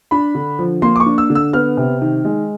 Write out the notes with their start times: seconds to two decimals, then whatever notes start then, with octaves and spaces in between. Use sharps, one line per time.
0.11 D4 B5
0.35 D3
0.59 F3
0.82 A#3 C6
0.96 D6
1.00 C#6
1.06 D4
1.18 E6
1.30 D3
1.35 E6
1.53 B3 F6
1.77 C3
2.01 D#3
2.25 G#3